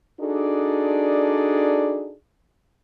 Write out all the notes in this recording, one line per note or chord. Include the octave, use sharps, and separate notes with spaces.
D4 D#4 F#4 G#4 A4 D5